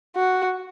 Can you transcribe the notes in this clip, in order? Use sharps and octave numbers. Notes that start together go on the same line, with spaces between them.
F#4